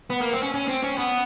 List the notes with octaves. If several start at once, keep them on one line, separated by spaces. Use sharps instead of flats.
B3
A#3
C4
C#4
C#4
C4
C#4
B3